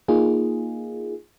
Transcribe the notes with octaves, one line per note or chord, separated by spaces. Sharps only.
A#3 D#4 F4 G#4